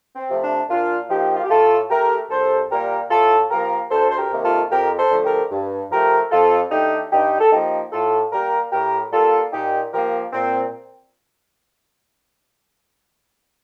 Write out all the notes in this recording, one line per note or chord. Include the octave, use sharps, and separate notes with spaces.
C4
C3 F3 A3
D4
A#2 D4 F4
F3 A#3 D#4 G4
F4
G4
A2 F4 A4
A3 G4 A#4
C2 A4 C5
A#2 G3 A#3 G4 A#4
A2 F4 A4
F3 A#3 G4 A#4
D2 A4 C5
C5
G4 A#4
C3 D#3 A#3
F4 A4
F2 G4 A#4
A4 C5
D3 F3 A3
G4 A#4
G2
F3 A3 G4 A#4
F2 F4 A4
D3 A3 D#4 G4
G2 D#4 G4
A4
F3 A#3 D#4 G4
A2 F4 A4
G3 A#3 G4 A#4
A2 G4 A#4
G3 A#3 F4 A4
A#2 D#4 G4
F3 A#3 G4 A#4
A#2 C4